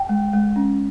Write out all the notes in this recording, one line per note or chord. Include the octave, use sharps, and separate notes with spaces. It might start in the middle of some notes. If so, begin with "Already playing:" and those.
Already playing: G5
G#3
G#3
C#4